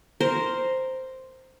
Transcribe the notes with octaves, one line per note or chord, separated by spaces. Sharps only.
A#4 C5